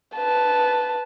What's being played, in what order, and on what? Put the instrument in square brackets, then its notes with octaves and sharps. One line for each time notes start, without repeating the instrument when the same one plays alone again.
[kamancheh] B4 A5